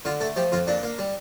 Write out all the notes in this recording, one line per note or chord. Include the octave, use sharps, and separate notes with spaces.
D3 F4
A3 A4
F3 G4
F2 F4
A#2 D4
A#3
G3